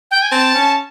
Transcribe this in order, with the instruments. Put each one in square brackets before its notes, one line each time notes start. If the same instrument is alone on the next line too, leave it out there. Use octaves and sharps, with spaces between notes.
[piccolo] G5
G#5
[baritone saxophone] C4 [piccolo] A5
[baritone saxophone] C#4